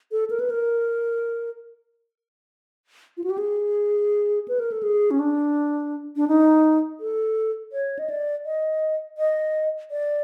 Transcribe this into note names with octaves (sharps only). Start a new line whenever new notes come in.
A4
A#4
B4
A#4
F4
F#4
G4
G#4
B4
A#4
A4
G#4
C#4
D4
D4
D#4
A4
C#5
D#5
D5
D#5
D#5
D5